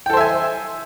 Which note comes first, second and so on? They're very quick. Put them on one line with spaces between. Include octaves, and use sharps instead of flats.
G5 A4 C5 E5 G#5